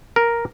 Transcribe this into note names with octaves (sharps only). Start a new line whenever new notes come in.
A#4